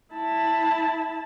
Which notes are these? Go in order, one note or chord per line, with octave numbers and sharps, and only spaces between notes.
E4 A5